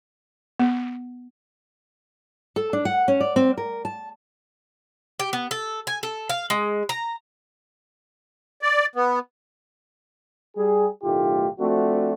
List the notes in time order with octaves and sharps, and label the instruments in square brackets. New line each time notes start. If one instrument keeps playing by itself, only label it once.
[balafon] B3
[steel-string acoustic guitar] A4
D4
F#5
C#4
D5
C4
A#4
A5
[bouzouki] G4
B3
A4
G#5
A4
F5
G#3
A#5
[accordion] D5
B3
[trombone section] G3 G#4
B1 A2 D#3 A3 F4 G4
F3 A3 C4 D4 F#4